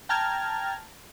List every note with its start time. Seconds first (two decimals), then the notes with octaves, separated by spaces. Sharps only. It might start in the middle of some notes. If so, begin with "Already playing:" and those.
0.09 G5 A5 A#5 F6 G#6